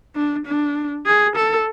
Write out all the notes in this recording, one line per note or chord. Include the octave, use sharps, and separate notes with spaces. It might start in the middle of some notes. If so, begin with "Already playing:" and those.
D4
D4
G#4
A4